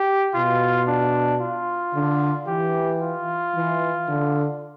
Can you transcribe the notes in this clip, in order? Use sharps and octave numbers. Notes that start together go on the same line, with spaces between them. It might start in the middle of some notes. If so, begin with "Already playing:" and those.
Already playing: G4
B2 F4
D4
F4
D3
E3 G4
F4
E3
D3